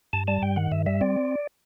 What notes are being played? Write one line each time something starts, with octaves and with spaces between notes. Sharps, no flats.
G2 A5
G3 A5
G2 G5
D#3 F#5
G2 E5
G3 E5
C4 D5